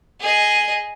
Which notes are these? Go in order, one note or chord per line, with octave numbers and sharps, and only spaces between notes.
G#4 D#5